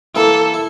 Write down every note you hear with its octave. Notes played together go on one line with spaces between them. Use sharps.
E3 A#3 E4 A4
E4